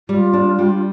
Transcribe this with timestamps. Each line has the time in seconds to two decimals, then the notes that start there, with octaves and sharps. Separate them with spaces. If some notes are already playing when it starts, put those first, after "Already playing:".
0.09 G3 F4
0.33 D4
0.59 G3